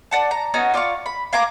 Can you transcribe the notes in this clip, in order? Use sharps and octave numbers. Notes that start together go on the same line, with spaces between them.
D5 F#5 A5
A#5
B3 C#4 D#4 F#4
F4 D5 F5 C#6
B5
F5 G#5 A#5 D6